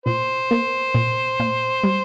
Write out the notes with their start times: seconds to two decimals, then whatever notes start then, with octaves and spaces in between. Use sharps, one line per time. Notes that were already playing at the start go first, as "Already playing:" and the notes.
0.06 A#2 C5
0.51 A#3
0.95 A#2
1.40 A#2
1.84 G3